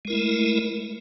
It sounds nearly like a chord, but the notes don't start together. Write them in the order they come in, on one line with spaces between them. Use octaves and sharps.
G#3 A#4 E4 A3